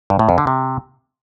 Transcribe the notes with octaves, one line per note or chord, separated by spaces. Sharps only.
G2
A2
F2
D3
C3